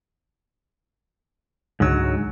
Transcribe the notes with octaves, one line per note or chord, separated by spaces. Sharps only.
C#2 G#2 D3 F#3 C#5